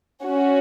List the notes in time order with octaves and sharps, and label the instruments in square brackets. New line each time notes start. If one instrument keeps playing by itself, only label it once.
[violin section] C#4 F#4